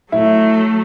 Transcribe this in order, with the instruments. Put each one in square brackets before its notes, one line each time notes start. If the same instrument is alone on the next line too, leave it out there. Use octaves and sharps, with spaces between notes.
[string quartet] F#3 A3 [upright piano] E4